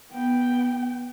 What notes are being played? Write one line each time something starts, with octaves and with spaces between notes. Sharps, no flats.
B3 G5